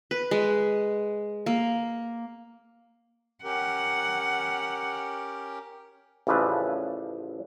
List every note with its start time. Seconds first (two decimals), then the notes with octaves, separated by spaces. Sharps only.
0.11 B4
0.31 G#3
1.46 A#3
3.44 C#4 G4 A#4 F#5
6.27 A1 C#3 F3 D4 B4 E5